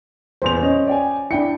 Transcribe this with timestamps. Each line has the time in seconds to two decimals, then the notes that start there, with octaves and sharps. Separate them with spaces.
0.42 D#1 E2 C5 F7
0.62 C#4 C#5 D#5
0.87 D5 G5 G#5
1.31 D4 E4 G5 C#7